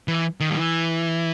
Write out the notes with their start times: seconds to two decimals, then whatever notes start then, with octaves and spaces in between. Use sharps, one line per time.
0.08 E3
0.40 D#3
0.50 G3
0.57 E3